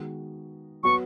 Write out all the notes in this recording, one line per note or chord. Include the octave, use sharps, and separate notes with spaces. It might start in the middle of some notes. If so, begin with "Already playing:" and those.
Already playing: D#3 G#3 B3 F#4
F#3 B3 F#4 B4 C#6